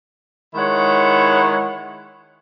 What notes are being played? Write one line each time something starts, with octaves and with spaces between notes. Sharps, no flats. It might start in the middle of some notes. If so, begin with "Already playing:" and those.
D#3 G#3 E4 C#5 F#5